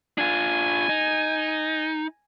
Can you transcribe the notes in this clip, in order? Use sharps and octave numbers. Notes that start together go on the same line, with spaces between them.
D4 F4 G#5
D#4